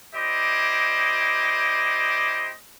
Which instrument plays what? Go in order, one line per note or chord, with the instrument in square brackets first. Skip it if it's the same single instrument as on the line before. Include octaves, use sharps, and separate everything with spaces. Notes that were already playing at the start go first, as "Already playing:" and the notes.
[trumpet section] E4 G4 C5 D5 D#5